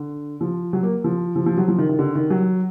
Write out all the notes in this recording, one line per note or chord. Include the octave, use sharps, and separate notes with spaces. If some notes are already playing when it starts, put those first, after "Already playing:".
Already playing: D3
F3
F#3
A#3
F3
F3
F3
F#3
F3
D#3
D#3
D3
D#3
F#3